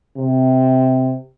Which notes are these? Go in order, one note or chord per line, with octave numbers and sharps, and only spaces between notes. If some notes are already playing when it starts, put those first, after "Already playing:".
C3